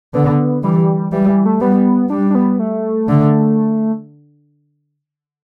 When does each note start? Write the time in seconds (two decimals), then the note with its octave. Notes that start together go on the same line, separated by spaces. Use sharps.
0.14 D3 B3
0.63 E3 G3
1.12 E3 G3
1.28 E3
1.45 A3
1.61 G3 B3
2.10 G3 D4
2.30 D4
2.35 B3
2.59 A3
3.08 D3